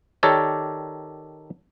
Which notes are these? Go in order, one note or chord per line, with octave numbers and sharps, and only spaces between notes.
D#3 G4 A4 A#4 C#5 D5